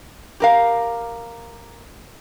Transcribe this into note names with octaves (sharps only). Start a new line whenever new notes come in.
G4 A#4 F5